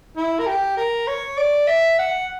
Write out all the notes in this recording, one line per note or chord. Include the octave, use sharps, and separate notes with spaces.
E4
A#4
G4
A#4
C#5
D5
E5
F#5